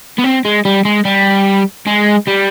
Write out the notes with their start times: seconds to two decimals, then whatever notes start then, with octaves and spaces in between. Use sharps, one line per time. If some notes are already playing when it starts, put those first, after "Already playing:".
0.18 B3
0.24 C4
0.45 G#3
0.65 G3
0.85 G#3
1.05 G3
1.87 G#3
2.27 G3